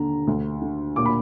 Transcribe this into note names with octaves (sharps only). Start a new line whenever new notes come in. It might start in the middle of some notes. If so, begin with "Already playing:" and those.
Already playing: D#2 D3 A#5
D2
D3
A#2 D6
B5